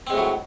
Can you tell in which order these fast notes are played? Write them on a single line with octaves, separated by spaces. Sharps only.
C4 G#3 A2 F#3